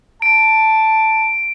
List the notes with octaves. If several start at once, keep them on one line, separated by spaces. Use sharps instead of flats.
A5 D7